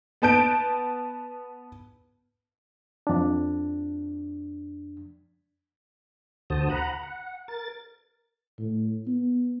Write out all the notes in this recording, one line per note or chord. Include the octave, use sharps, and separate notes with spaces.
B3 B4 A5 G6 D7
F2 D4
D2 D3 F#4 C5 A5 D#6
F#5 A#5 B5
F#5
A#4 A6
A2
B3